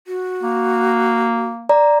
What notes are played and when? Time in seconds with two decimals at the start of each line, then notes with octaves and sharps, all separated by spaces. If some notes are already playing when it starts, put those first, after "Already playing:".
0.07 F#4
0.43 A#3
1.69 D5 A#5